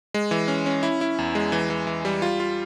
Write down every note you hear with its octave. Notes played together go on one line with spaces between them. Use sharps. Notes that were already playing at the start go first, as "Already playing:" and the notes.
G#3
E3
C#4
C#4
E4
E4
E2
G#3
E3
E3
E3
G3
F4
F4